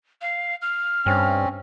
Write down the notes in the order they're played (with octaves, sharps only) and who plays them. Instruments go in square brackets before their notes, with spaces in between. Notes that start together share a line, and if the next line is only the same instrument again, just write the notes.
[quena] F5
F6
[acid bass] G2 [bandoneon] C4 C#4